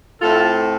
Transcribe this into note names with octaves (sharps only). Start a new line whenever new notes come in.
A2 A3 C4 F4 A4